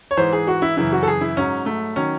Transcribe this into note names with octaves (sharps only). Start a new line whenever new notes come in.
C#5
G#2 E3 C5
G#4
F#4
E4
F#2 C#3 E3 E4
F#4
A4
G#4
E4
G#2 F#3 C#4
A3
D#3 F#3 C#4